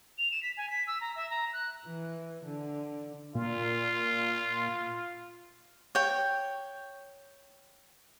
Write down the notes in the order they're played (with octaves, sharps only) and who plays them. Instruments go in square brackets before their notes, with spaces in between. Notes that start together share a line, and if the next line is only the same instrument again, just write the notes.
[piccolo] F7
E7
B6
G#5
B6
E6
A#5
E5
A#5
F#6
[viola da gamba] E3
D3
[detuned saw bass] A#2 [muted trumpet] F4
[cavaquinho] C#5 G5